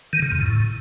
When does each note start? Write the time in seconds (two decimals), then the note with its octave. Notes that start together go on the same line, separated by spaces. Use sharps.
0.13 D#3
0.22 C#3
0.32 F2
0.41 A2